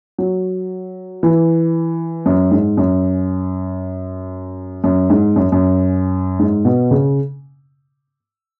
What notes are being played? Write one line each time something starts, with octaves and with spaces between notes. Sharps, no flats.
F#3
E3
F#2
G#2
F#2
F#2
G#2
F#2
F#2
G#2
B2
C#3